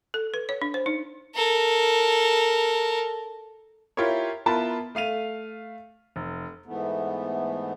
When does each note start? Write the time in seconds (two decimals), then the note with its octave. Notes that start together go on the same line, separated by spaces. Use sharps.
0.14 A4
0.34 B4
0.49 C#5
0.62 D4
0.74 C5
0.86 D#4
1.35 A4 A#4
3.97 E4 F4 G4 A#4 C#5
4.46 B3 E4 F4 A#4 A5 B5
4.95 A3 F5 D#7 F7
6.16 F1
6.66 G#2 E3 A3 B3